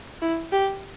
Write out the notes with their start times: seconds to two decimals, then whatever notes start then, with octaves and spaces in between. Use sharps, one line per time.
0.22 E4
0.52 G4